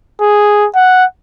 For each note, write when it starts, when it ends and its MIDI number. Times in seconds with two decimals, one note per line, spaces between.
0.20 0.66 68
0.75 1.05 78